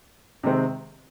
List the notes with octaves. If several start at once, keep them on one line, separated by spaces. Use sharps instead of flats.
C3 D#3 G#3 C4